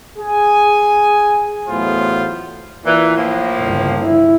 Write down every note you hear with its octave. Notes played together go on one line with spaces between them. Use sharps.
G#4 G#5
E2 A2 F#3 B3 F4 C5
A#2 E3
A2 F3 A#3
G1 C#2
E4